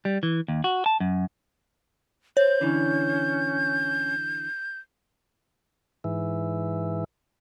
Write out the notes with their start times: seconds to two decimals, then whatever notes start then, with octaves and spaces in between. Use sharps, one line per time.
0.05 G3
0.23 E3
0.48 D#2
0.64 F#4
0.86 A5
1.00 F#2
2.37 C5 C#5 G6
2.61 D3 E3 C#4
6.04 G#2 E3